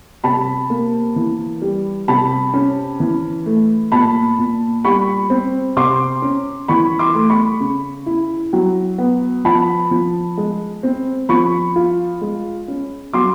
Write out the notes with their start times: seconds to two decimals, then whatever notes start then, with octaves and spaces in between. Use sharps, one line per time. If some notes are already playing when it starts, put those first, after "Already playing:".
0.24 C3 A5 B5
0.70 A#3
1.16 E3
1.62 G3
2.08 C3 A5 B5
2.53 C#4
3.00 E3
3.46 A3
3.92 A#2 A5 B5
4.39 A#2
4.84 G3 B5 C#6
5.30 C4
5.76 C3 C6 D6
6.22 C#4
6.68 E3 B5 C#6
6.99 C6 D6
7.15 A3
7.29 B5 C#6
7.60 C#3
8.06 E4
8.53 F#3
8.98 B3
9.45 F3 A5 B5
9.91 F3
10.38 G#3
10.83 C4
11.29 F3 B5 C#6
11.76 F4
12.21 G#3
12.68 C#4
13.13 F#3 C6 D6